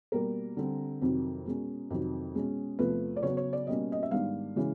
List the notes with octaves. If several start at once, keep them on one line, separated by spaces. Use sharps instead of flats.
B2 G3 A#3 A#4
D3 G3 C4
F2 C3 D#3 F#3
B2 G#3 C#4
F2 C3 D#3 F#3
B2 G#3 C#4
E2 C3 F3 A3 B4
D5
C#3 F#3 B3 C#5
C#5
D5
B2 G3 A#3 C#4 D#5
D#5
E5
G#2 D#3 G3 B3 D4 F5
C#3 E3 G#3 C#4